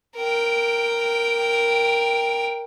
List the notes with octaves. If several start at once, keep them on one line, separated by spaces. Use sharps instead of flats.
A#4 G5